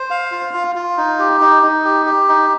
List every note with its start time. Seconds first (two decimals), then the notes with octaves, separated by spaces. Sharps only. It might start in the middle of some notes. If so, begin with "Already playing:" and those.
Already playing: C5
0.10 F5
0.32 F4
0.54 F4
0.75 F4
0.97 D#4
1.19 G4
1.41 D#4
1.63 D#4
1.84 G4
2.06 G4
2.28 D#4